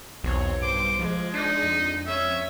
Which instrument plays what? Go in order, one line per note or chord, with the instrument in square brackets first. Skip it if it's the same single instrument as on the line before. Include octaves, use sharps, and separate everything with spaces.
[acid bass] B1 [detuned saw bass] E2 [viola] C4 C#5
[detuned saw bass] G2 [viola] C5 [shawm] D6
[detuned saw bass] F3 [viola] G#3
[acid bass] D4 [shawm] D#4
[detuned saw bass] F2
[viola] C#4 C#5 [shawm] E5